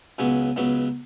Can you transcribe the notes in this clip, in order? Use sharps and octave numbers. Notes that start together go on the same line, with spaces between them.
C#2 C#3 F#3 B3 G#5
C#2 C#3 F#3 B3